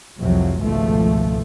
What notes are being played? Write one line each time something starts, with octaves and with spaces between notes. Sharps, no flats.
C2 F2 C3 F3 F#3
G#1 C#2 B2 F3 A3